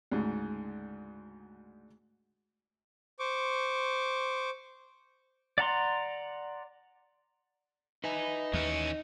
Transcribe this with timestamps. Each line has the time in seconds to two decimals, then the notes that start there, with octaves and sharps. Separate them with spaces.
0.11 D2 G#2 C#3
3.19 C5 C#6 D6
5.58 D5 F#5 A#5 C6
8.04 D#4 B4 E5 G#5
8.54 D#2 E3 C#4